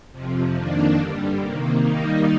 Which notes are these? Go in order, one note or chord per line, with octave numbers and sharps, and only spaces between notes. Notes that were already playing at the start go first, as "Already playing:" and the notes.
F2 C3 F3
F2 D#3 A#3 D4
G2 D3 G3
C3 D#3 A#3
D#3 G3 A#3 D#4